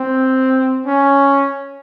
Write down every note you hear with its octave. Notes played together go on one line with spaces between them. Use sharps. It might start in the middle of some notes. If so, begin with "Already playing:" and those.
Already playing: C4
C#4